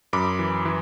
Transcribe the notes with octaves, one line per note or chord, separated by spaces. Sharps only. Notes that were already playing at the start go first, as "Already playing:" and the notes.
F#2 B5 D6
E3
E3